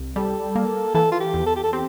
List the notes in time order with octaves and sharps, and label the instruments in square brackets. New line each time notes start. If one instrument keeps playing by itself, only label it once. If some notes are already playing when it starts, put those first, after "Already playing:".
Already playing: [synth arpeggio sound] C2
[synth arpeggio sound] G3 [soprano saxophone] A4
[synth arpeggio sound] A#3
[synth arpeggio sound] E3 [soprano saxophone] A4
[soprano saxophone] F4
G4
[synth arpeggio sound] E2
[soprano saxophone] A4
G4
A4
[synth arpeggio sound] C4 [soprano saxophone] G4